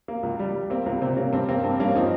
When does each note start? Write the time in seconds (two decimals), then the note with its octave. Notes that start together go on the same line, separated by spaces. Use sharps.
0.08 A#3
0.23 C#2
0.39 G3
0.55 G3
0.70 A#3 C4
0.86 C#2 A#3
1.01 C3 C4
1.17 A#3 C#4
1.33 G2 C4
1.49 A#3 C4
1.64 G2 C4
1.80 G2 A#3 C#4
1.95 F3 C4 D#4